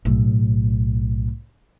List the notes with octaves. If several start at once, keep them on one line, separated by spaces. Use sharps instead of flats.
B1 A2